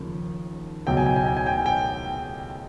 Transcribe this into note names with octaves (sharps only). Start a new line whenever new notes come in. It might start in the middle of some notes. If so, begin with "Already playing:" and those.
Already playing: D#2 C#3 F3
C#2 B2 F#3 G5
G#5
G5
G#5
G5
G#5
G5
G#5
G5